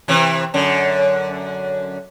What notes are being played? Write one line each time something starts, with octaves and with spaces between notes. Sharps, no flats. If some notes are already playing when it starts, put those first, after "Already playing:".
C3 E3
F#2 D3